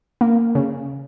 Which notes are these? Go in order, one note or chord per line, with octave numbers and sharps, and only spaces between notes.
A#3
C#3